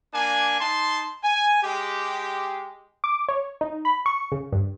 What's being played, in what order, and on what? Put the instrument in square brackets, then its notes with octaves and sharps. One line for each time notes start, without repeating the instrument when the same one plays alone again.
[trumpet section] A#3 D4 G#5
D#4 A5 C6
G#5
G#3 G4
[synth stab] D6
C#5
D#4
B5
C#6
C#3
G2